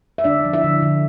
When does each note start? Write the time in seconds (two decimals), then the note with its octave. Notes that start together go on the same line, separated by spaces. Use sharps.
0.18 E5
0.24 D3 D4 D5
0.45 F3
0.54 E4 E5
0.64 D3
0.82 D3